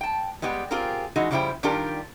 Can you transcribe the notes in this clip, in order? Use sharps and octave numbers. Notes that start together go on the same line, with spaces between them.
G5 A5
G3 G#3 B3 G4
C4 F4 G4 G#4 A#4
E3 G#3 D#4 F#4
C#3 F3 G3 E4 C5 G5
D#3 G3 D4 F4 G4 A#4